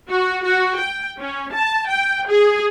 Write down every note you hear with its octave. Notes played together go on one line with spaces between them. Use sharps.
F#4
F#4
G5
C#4
A5
G5
G#4